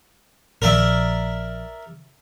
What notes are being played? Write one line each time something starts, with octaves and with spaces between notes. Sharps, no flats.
A#1 A#4 D5 E5